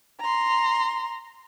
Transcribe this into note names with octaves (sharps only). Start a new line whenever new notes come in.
A#5 C6